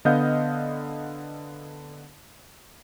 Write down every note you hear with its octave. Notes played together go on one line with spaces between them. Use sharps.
D3 B3 D#5 F5 G6